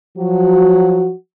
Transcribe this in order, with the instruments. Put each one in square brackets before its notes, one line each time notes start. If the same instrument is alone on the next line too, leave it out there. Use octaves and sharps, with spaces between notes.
[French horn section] F3 F#3 F#4